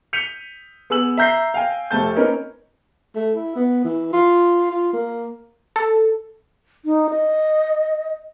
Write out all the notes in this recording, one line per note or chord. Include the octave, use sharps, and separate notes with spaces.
G6 B6 C#7 D#7 F7
B3 G#4 G#5 E6 F#7
E5 A#5 G6 A#6 C7
F5 G5 G#5
F1 A3 A5 G6
A#3 C4 C#4 D#4 A#4 B4
A3
E4
B3
E3
F4
F4
A#3
A4
D#4
D#5